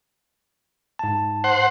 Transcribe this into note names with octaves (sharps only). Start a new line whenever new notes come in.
G#2 A5
C5 F#5